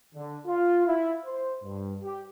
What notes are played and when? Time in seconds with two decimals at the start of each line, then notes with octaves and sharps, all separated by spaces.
0.14 D3
0.46 F4
0.86 E4
1.24 C5
1.63 G2
2.01 G4